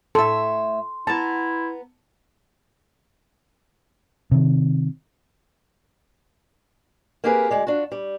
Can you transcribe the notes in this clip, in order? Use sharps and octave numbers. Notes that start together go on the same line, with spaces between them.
A2 A4 E5 C6
B3 E4 A5 A#5
C3 D#3
A#3 C4 G4 G#4 A#4 B4
D2 G#3 D5
D4 F4 F#4
G3